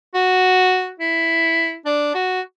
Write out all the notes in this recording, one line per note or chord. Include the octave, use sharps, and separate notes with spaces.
F#4
E4
D4
F#4